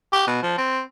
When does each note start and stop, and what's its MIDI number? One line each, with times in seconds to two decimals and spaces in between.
0.13 0.25 67
0.27 0.38 47
0.43 0.57 53
0.58 0.81 60